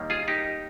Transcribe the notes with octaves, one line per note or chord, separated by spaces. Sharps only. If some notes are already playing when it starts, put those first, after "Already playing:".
Already playing: D#2 D#3 G3 A#3
F4 G#4
D#4 G4